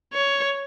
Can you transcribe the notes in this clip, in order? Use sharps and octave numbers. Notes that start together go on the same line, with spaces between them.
C#5